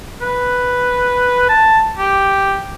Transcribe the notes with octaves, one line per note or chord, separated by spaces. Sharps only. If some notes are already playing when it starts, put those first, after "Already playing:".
B4
A5
G4